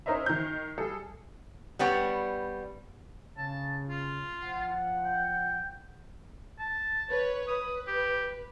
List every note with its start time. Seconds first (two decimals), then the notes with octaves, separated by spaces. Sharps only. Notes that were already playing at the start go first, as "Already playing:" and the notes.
0.06 C#4 D#4 A#4 C5 D#5 E5
0.26 D#3 G6
0.78 G3 G#4 A4
1.79 G3 B3 D4 C#5
3.37 C#3 A5
3.89 F4
4.45 F3 F#5
5.05 G5
6.59 A5
7.10 B4 C#5
7.48 B4 D#6
7.87 G4